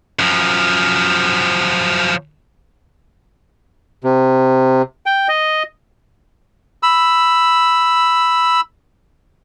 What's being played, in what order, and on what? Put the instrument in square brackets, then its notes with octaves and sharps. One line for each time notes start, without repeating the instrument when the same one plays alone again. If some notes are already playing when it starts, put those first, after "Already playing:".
[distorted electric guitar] F#2 F3
[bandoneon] C3
G5
D#5
[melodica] B5 E6